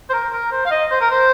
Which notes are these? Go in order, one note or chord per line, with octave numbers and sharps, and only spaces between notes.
C5
A#4
A#4
C5
F5
D#5
C5
A#4
C5